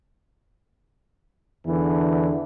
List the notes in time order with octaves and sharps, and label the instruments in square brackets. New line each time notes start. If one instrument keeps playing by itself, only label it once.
[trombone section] E2 D3 E3